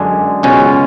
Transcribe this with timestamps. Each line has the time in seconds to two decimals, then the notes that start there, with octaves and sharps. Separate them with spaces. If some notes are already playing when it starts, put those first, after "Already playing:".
Already playing: F#2 D3 G#3 D4 G#4
0.43 C#2 B2 G#3 C#4